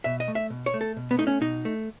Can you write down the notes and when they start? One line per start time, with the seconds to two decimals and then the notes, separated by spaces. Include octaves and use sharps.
0.04 B2 E5
0.20 D#5
0.28 A3
0.35 E5
0.50 B2
0.66 C#5
0.74 A3
0.81 A4
0.97 B2
1.11 B3
1.18 A3 D#4
1.27 C#4
1.41 B2 D#4
1.65 A3